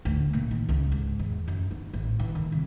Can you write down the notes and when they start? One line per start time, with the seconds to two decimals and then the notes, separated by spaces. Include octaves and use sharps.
0.05 D2
0.33 A#2
0.51 D#3
0.69 C#2
0.92 G#2
1.19 E2
1.48 F#2
1.71 D#4
1.93 A1
2.20 E3
2.35 D#3
2.52 C2